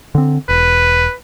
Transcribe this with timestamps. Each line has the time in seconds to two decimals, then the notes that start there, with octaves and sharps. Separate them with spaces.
0.15 D3 C4
0.49 E1 B4